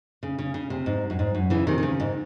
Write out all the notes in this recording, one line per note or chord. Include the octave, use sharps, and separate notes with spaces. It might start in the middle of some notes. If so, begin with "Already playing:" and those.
C#3
C#3
C#3
C3
G#2
F#2
G#2
F#2
C#3 E3
C3 D#3
D#3
C#3
G#2